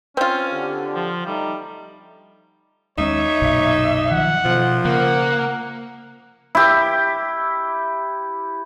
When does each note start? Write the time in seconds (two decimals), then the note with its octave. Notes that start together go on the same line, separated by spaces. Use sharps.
0.17 C4 C#4 F4
0.53 D3 G4
0.95 F3
1.26 G3 A3 D#4
2.98 D#2 G#3 C#4 D#4 C#5 E5
3.42 B1 F#2 A#2
4.11 D#3 F3 F#3 F#5
4.45 B2 F3
4.85 C#3 A#3 F#5
6.55 E4 G4